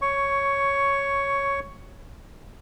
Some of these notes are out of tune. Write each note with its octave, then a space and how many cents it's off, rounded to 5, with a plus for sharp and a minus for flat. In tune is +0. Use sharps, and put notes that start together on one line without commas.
C#5 +0 C#6 +10